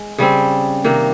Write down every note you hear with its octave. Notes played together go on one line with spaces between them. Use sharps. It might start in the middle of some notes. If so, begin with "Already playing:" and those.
Already playing: G#3
C#3 G3 C4
C3 D#3 A#3